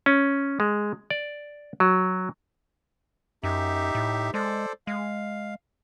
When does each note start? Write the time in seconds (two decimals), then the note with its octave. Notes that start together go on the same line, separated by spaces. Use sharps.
0.06 C#4
0.60 G#3
1.10 D5
1.80 F#3
3.43 F#2 D#4 G4 E5
3.95 A2
4.34 G#3 A4 C5 D5
4.87 G#3 F5